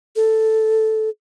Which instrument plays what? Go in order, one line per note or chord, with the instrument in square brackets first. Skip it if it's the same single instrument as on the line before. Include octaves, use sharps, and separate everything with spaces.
[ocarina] A4